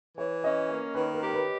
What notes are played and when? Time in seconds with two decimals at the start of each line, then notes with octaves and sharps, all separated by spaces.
0.18 E3 C#5
0.44 C#4 D#5
0.69 A#3 C#5
0.95 D#3 B4
1.14 A#4
1.20 G4
1.33 B4